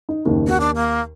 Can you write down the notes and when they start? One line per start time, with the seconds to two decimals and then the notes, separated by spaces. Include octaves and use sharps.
0.09 D#4
0.25 F#1 D#2 D#3
0.48 D#2 F#4
0.60 D4
0.76 A#3